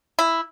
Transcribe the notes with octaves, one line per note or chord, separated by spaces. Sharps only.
E4